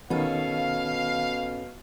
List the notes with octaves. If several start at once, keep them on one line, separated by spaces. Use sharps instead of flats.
B2 D#3 B3 C#4 A4 F5